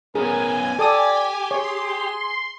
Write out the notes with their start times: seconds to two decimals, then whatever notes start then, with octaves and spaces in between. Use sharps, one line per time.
0.15 B3 C#4 G#4 A#4 G#5
0.79 G4 A4 D5 G#5 D#6
1.51 G#4 C#5 C6